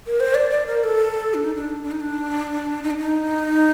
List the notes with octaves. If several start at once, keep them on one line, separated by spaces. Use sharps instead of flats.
A#4
C5
D5
D5
A#4
A4
D4
D#4
D4
D4
D#4
D4
D#4
D4
D#4